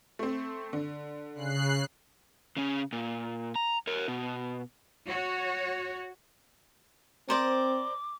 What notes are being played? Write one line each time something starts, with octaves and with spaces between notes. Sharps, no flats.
A3 C4
D3
C#3 F#6 C7
C#3 C#4
A#2
A#5
A#4 C#5
B2
F#4 C#5
C4 A#4 C5 D5 D6